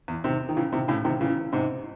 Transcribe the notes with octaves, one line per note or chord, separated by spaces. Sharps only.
E2
C3 D#3
D#3
C#3 E3
C3 D#3
A2 C#3
C3 D#3
C#3 E3
G#2 C3